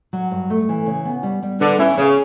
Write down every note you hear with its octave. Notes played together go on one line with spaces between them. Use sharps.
F#3
G2
A3
E3
C#3
B3
G3
G3
D3 B4
E3 C#4
C#3 C#4